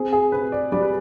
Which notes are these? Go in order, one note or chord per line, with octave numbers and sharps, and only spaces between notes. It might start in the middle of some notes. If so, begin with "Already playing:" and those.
Already playing: C4 G#4
G#4
C3 B4
D5
G3 D5
B4